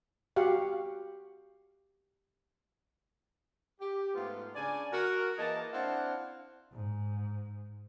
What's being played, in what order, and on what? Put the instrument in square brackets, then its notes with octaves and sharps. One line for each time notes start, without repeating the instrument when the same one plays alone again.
[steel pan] F#4 G4 F5 F#5
[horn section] G4
G#2 A3 B3 F4
C#3 D4 D5 G#5
F#4 A#4
E3 A#3 G#4 D#5 A5
C4 D4 E4 F5 F#5
[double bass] G#2